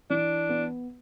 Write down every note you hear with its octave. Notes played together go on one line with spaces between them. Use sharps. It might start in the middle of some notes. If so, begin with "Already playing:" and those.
E3 D4
B3